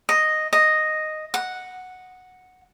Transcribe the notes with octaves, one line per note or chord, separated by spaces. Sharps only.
D#5
D#5
F#5